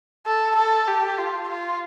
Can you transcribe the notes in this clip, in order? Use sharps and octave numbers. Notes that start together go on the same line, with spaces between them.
A4
A4
G4
F4
F4